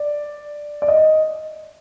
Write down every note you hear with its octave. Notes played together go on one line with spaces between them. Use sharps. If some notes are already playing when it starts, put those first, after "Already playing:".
Already playing: D5
D5
D#5